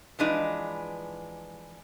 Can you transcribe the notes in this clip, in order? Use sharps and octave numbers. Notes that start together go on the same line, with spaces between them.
E3 F3 G#3 D4 D#4 B4